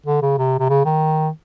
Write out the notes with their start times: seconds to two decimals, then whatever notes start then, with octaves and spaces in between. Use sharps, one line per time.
0.06 D3
0.22 C#3
0.38 C3
0.59 C3
0.69 C#3
0.85 D#3